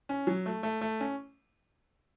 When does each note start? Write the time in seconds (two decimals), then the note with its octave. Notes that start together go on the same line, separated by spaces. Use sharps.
0.09 C#4
0.27 F#3
0.46 A3
0.63 A3
0.81 A3
1.00 C#4